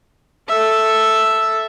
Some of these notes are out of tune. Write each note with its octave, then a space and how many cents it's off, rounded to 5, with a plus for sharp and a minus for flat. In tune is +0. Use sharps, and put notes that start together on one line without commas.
A4 +0 E5 +0